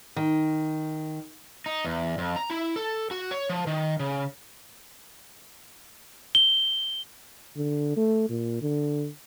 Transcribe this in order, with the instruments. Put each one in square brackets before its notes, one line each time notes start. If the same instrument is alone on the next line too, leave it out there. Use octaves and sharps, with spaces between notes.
[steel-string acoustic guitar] D#3
[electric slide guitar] D#4
E2
F2
A#5
E4
A4
F#4
C#5
F3
D#3
C#3
[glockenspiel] G7
[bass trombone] D3
A3
A#2
D3